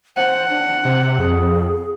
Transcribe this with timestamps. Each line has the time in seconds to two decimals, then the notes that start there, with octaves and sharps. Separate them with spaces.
0.17 C5 F#5
0.50 D4
0.85 C3 C5
1.19 F2 G#4